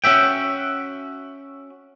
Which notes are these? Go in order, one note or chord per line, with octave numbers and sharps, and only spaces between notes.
C#4 F#4 E5 G5